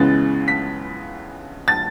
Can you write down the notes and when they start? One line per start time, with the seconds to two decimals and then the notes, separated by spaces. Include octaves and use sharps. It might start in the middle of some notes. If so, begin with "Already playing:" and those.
Already playing: C#2 C#3 E3 G#3 B3 A6
0.48 B6
1.68 A6